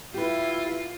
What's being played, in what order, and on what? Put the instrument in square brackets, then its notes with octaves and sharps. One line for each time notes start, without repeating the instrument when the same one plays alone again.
[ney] E4 [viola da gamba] F4 [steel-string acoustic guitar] G4 B4